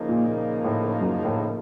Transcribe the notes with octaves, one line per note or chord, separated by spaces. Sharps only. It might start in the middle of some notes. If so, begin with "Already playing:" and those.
Already playing: C#3 F3 A#3 D#4
A#2
A#2
A2
F#2
A2